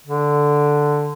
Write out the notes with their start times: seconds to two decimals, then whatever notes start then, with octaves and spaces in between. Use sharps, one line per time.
0.07 D3